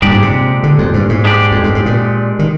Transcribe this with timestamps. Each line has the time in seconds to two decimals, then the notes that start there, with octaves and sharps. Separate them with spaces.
0.02 G2 A#2 G#3 D4 G4 D5
0.12 G#2
0.22 C3
0.63 D3
0.79 F2
0.94 G2
1.09 G#2
1.25 G#3 D4 G4 D5
1.52 F2
1.64 G2
1.75 G#2
1.86 A#2
2.39 D#3